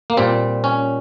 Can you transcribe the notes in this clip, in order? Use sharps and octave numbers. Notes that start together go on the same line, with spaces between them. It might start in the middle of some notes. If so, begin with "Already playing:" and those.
A#3
A#2 G3 C4
C#4